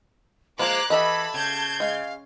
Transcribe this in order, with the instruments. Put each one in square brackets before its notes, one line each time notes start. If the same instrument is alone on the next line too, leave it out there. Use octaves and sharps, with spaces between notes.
[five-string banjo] F3 F4 C5 [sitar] G#3 A#3 [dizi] A#5 [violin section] D6 F#6
[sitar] E3 [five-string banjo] G4 A4 D#5 [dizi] A5 [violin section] B5
[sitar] C#3 [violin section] G6 G#6
[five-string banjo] G#3 [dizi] F5